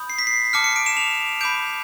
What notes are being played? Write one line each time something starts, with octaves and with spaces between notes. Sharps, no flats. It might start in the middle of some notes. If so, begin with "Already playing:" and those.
Already playing: B5 D#6 G6
C7
B6
C7
A5 D6 F6 C#7
C#7
D7
E7
F7
B5 D6 G6 D7